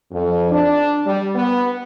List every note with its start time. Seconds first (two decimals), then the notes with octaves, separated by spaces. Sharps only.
0.12 F2
0.51 D4
1.05 G3
1.35 B3